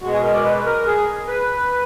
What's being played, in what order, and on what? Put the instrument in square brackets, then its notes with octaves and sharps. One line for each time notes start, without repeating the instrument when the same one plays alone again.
[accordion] B2 G#3 F#4
G#4
A#4
D5
B4
A#4
G#4
B4